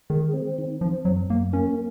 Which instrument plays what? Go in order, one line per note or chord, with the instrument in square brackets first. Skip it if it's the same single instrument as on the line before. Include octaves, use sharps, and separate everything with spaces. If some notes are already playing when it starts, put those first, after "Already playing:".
[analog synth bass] D#3 [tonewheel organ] G#3
[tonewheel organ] C4
D#3
[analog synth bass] F3 [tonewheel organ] C4
[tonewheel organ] F#2 [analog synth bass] F#3
[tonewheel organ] F#2 [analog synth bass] A#3
[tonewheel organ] A#3 [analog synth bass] C#4